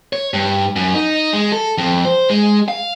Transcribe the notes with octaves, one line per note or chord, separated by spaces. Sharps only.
C#5
G2
F#2
D#4
G#3
A4
F2
C5
G#3
F5